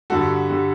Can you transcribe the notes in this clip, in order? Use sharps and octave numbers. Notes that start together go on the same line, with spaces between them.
G2 D3 G3 F#4 A4
D3 G3